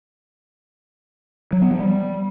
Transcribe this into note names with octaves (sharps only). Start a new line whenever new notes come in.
F#3
B3
F3
G3